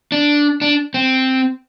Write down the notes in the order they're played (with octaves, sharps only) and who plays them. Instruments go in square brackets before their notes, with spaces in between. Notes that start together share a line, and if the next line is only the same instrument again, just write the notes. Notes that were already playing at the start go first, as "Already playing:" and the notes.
[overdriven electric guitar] D4
D4
C4